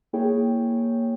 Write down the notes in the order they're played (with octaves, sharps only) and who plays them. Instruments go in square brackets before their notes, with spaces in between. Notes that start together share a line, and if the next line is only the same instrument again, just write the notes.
[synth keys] A#3 E4 G#4 C#5 G5